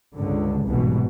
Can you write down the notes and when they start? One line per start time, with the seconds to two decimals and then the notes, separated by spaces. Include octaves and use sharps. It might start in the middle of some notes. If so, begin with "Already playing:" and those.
0.15 C#2 G2 D3
0.65 F#1 C2 G#2 B2 E3